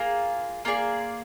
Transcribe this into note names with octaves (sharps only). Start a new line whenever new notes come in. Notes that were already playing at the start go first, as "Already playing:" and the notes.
Already playing: A#3 F4 G#4
A#3 F4 G#4 D5